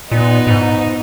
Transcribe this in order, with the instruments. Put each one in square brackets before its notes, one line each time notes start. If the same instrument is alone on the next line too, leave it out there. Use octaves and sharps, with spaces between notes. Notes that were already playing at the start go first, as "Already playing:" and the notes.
[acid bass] A#2 [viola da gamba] B3 D#4
[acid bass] A#2
G#2